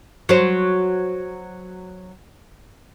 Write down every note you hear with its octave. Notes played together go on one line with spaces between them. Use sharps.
F#3 C5